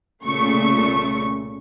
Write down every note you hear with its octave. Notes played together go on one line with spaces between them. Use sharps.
C2 A#2 C#3 A3 C#6